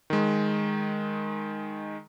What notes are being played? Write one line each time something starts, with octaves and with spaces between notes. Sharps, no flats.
D#3 G#3